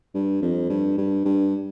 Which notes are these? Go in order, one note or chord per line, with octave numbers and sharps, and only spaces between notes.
G2
F2
G2
G2
G2